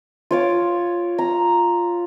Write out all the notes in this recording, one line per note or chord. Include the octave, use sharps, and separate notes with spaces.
F4 C#5 D6
A#5